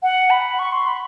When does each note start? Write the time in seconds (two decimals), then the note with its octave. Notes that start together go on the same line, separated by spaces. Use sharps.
0.03 F#5
0.30 B5
0.59 C#6
0.72 C6
0.87 B5